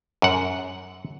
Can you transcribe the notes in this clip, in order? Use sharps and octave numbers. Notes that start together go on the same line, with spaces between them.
F#2 F#5